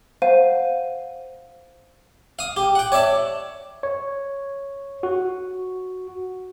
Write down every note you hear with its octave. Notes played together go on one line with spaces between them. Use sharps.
C5 F5 F#5 D#7
F5 D#6
G4
F#5 G5
C#5 D5 E5 A5
C#5
F#4